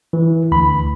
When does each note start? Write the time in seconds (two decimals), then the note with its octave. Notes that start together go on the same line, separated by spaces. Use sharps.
0.13 E3
0.52 D2 B5